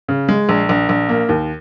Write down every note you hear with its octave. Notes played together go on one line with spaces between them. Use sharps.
C#3
G#3
A#1
A#1
A#1
A#3
D#2